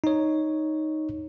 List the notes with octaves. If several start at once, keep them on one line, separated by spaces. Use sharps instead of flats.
D#4 C#5